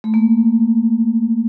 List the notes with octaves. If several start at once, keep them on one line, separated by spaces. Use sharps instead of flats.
A3
A#3